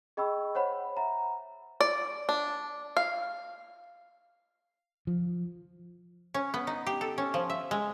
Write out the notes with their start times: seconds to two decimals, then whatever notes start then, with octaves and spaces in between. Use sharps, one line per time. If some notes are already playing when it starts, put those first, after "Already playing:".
0.17 G#4 D#5 G5 B5 C#6 E6
0.55 C5 C#5 F#5 B5
0.97 E5 F#5 A#5
1.81 D5
2.29 D4
2.97 F5
5.07 F3
6.34 C#4
6.54 B3
6.67 D#4
6.86 G4
7.01 A4
7.18 C#4
7.34 F3
7.50 E5
7.71 G#3